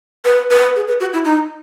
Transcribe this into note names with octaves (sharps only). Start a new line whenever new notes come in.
B4
B4
G#4
B4
F#4
E4
D#4